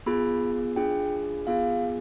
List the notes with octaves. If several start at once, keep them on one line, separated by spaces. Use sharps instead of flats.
B3 F4 G#4 B5
D4 F4 G#4 G5
B3 F4 G#4 F5